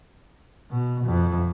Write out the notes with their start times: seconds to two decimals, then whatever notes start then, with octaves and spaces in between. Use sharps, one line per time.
0.71 B2
1.05 F2